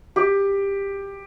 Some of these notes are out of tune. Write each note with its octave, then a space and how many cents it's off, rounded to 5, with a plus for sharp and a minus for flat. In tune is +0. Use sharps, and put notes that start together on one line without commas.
G4 +15